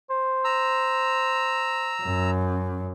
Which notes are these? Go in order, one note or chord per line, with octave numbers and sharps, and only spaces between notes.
C5
A#5 E6
F#2